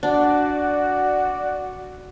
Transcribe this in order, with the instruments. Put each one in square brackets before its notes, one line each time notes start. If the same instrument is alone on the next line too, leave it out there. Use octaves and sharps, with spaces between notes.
[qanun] D4 [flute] F#4 [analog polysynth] D5 [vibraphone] F#5